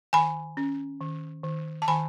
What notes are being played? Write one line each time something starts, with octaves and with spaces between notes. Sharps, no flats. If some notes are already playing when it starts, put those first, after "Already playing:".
D#3 G#5 B5
C#4
D#3
D#3
A5
D#3 G#5 B5